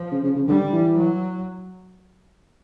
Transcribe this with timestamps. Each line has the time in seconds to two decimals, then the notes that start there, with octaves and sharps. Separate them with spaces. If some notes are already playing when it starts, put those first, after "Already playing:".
Already playing: F3
0.12 C#3
0.24 C#3
0.36 C#3
0.48 D3 G3
0.73 E3
0.97 F#3